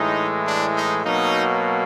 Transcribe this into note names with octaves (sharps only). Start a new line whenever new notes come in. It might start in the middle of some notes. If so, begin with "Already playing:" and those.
Already playing: A2 E3 G#3 D#4
D4
D#4
B2 F#3 A#3 D#4